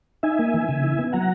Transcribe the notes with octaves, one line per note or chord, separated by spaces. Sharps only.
D#4 E5 G#5
A#3
E3
C#3
E4
B3
F#3 F#5 A#5